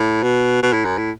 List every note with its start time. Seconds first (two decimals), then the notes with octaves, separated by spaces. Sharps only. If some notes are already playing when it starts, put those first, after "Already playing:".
Already playing: A2
0.23 B2
0.63 B2
0.73 A2
0.85 F#2
0.98 A2